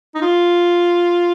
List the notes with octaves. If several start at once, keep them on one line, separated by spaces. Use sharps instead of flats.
D#4
F4